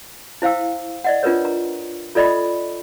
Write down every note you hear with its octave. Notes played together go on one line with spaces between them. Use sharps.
E4 C5 F5 G5 E6
D5 D#5 F#5
D4 F4 A#4 B4 C#5
A#5
F4 A4 D5 D#5 B5